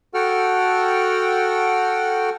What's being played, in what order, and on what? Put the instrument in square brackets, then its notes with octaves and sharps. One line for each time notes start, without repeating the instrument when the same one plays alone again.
[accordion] F#4 A4 F#5 G5 F6